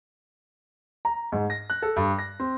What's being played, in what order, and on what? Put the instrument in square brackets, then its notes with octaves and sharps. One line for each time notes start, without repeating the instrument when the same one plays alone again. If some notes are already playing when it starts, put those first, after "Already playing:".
[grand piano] A#5
G#2
A#6
F#6
A4
G2
A#6
C4